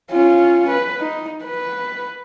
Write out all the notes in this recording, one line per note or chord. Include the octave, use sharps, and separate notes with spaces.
C#4 F4
B4
D#4
B4